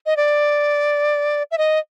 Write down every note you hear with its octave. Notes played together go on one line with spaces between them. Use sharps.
D#5
D5
E5
D#5